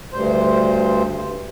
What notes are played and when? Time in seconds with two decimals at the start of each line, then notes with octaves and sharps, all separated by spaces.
0.13 D2 G2 C5